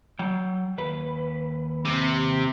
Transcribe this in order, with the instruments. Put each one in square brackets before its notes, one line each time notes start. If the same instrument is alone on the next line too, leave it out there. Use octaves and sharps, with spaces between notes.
[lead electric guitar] F#3 G5
D#2 B4
[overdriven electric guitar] C3